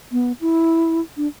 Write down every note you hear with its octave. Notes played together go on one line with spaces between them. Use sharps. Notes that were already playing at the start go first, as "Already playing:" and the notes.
B3
E4
D4